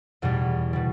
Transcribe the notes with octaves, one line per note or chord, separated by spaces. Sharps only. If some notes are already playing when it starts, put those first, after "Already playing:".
E2 B2 G3
B2 G3